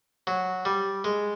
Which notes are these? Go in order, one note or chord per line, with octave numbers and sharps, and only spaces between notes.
F#3
G3
G#3